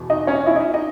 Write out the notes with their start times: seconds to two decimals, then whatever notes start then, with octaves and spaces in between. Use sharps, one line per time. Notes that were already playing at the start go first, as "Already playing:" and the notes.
Already playing: E2 B2
0.10 D#4 D#5
0.27 C#4 C#5
0.46 E4 E5
0.56 D#4 D#5
0.74 D#4 D#5